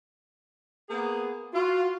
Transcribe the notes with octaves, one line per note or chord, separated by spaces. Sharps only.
A#3 B3 G#4
F4 F#4